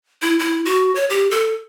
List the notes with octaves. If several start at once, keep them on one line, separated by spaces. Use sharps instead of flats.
E4
E4
F#4
C#5
G4
A4